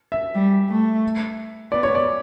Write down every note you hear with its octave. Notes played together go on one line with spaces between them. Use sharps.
E5
G3
A3
B3 D5
C#5
D5